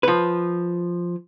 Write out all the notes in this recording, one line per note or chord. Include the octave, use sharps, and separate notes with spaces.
F3 B4